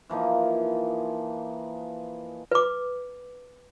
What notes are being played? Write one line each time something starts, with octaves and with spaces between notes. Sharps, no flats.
E3 F3 A#3 D#4
B4 D6